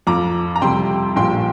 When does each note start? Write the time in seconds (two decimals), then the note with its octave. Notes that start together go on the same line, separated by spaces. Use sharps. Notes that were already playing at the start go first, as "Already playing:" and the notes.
0.07 F2 F3 A#5 D6
0.56 A#5
0.62 F2 C3 G3 G5 C6
1.16 A#1 A#2 F3 G5 C6